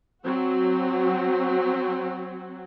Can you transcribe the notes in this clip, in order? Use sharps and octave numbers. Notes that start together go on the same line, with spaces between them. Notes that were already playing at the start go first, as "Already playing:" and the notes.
F#3 C4 F#4